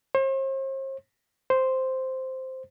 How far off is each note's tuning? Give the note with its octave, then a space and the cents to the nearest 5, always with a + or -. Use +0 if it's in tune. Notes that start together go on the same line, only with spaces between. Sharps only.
C5 +40
C5 -5